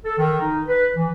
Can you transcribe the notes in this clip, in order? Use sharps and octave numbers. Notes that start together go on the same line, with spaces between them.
A4
D#3
D#4
B4
E3